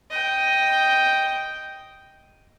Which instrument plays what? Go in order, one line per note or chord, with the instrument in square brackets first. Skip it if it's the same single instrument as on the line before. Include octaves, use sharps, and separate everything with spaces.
[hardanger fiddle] D#5 G5